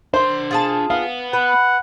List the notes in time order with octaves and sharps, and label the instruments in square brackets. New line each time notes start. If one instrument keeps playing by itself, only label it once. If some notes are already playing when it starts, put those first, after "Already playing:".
[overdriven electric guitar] D4 C6 [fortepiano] C5
[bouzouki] F4 G#4 A5
[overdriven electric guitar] B3 [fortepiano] F5
[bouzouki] B4 [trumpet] F#5